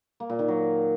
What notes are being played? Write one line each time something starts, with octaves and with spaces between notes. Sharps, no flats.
A#3
A#2
D#3
F#3